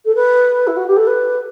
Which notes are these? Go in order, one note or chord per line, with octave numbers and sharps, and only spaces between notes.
A4
B4
E4
F#4
G4
A4
B4